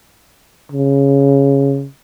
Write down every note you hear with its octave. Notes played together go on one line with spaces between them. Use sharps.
C#3